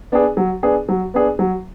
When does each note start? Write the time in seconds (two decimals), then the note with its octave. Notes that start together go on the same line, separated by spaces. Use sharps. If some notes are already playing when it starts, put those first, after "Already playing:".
0.12 B3 D4 G#4
0.37 F#3
0.63 B3 D4 G#4
0.89 F#3
1.14 B3 D4 G#4
1.39 F#3